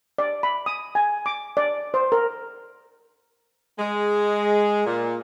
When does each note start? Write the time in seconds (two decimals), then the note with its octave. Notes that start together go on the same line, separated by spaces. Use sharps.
0.18 D5
0.43 B5
0.66 D#6
0.95 G#5
1.26 D6
1.57 D5
1.94 C5
2.12 A#4
3.79 G#3
4.86 A#2